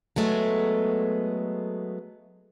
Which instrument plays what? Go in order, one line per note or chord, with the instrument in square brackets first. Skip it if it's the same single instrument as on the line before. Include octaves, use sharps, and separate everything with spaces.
[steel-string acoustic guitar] F#3 G#3 A3 B3